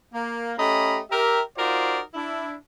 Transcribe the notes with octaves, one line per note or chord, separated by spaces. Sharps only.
A#3
A3 C#4 G4 D#5 A#5 B5
G4 A#4 E5
D#4 F4 F#4 A#4 C5 D5
D4 E4